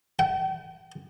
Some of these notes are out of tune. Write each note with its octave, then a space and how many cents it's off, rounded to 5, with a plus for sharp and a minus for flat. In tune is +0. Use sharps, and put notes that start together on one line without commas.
G5 -45